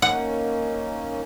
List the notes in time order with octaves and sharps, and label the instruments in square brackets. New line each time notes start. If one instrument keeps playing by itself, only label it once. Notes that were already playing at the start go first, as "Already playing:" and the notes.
[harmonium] A#3 C#4 D#4 [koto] F#5